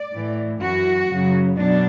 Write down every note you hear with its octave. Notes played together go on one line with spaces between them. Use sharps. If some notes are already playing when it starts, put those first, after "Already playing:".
Already playing: D5
A2 E3
F#2 E3 F#4
F#2 C#3 F#3
B2 F#3 D4